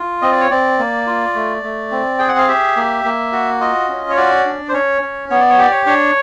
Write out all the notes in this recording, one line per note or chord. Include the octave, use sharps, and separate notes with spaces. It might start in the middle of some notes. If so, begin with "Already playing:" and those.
Already playing: F4
C4 D#5
D5
C#5
C4 D5
A#3
F4
A3
A3
C4
G#4 G5
F#5
F5
G4 E5
A#3
A#3
F#4
F4 D#5
C#4
C#5
F#4 D5
D4
C5
C#4 C#5
C#4
B3 C#5
D5
C#5
G4 D5
C#5
D4 C#5